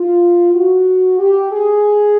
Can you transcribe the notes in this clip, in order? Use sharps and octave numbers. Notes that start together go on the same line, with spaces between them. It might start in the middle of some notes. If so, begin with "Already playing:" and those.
Already playing: F4
F#4
G4
G#4